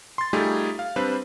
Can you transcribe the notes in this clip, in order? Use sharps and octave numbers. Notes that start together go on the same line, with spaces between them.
C6 A6
G3 A3 D#4 F4 G4 G#4
F5
G3 C4 D4 B4 C5